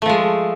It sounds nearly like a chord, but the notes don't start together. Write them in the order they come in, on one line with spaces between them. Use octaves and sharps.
A3 F3 G#3